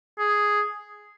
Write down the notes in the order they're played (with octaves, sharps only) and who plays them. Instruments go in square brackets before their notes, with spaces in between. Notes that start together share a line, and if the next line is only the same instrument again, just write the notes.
[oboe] G#4